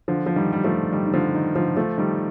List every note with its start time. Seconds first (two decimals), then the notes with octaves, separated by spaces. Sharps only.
0.08 D3 F3
0.26 F3
0.36 D#3 G3
0.53 G3
0.64 F3 A3
0.92 D#3 G3
1.06 D#3
1.14 D3 F3
1.35 D#3
1.56 D3 F3
1.77 F3 A3
1.98 D#3 G3